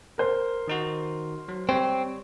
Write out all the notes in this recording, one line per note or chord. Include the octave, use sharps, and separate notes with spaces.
A#4 C5
D#3 D#4 F#4
F#3
G3 C4 C#5